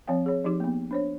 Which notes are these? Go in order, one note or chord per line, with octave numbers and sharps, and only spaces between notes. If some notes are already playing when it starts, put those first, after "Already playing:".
F3 C4 C#5 F5 G5
G#4 C#5
F3 D#4 G4 D6
A#3 B3
D4 C5 C#5